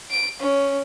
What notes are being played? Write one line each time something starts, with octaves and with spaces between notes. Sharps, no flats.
D7
C#4